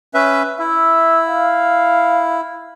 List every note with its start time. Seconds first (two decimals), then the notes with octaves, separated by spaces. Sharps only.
0.14 C#4 B4 E5
0.59 E4 E5
1.27 F5